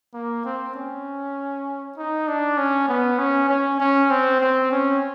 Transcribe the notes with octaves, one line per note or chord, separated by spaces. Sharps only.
A#3
C4
C#4
D#4
D4
C#4
B3
C#4
C#4
C#4
C4
C4
C#4